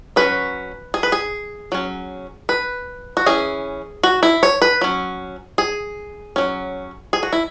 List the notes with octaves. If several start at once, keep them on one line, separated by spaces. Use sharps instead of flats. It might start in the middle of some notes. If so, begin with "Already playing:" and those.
F#3 C#4 B4
G#4
B4
G#4
F#3 C#4
B4
F#4
E3 C#4 G#4
F#4
E4
C#5
B4
F#3 C#4
G#4
F#3 C#4
G#4
F#4
E4